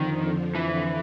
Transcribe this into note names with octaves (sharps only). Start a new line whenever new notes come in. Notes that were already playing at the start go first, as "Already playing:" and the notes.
Already playing: F2 D3 D#3 F3
E3